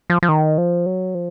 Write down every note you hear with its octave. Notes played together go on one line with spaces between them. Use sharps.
F3
F3
D#3
F3
F#3
F3